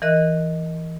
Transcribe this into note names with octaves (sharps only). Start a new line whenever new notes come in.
E3 A#4 D#5 F#6